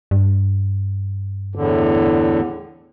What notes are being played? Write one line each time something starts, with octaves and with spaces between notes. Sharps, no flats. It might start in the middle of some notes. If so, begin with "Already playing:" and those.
G2
E2 A2 D3